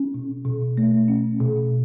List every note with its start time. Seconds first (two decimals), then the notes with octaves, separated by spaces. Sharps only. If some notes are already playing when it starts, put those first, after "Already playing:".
Already playing: C#4
0.14 B2
0.45 B2
0.78 A3
1.08 C#4
1.41 B2